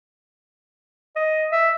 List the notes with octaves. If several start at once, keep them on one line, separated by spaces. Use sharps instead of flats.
D#5
E5